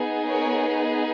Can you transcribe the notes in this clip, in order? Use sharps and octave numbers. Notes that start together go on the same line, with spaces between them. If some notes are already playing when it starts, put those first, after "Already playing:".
Already playing: B3 D#4 G#4
A#4 C#5